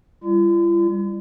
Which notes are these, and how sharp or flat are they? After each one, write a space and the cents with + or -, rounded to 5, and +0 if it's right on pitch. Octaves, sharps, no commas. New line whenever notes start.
G3 +20 F4 -45